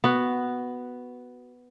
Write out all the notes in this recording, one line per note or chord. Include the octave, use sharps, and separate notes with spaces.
B3 F#4